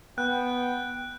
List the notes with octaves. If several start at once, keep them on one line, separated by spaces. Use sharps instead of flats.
B3 G5 F#6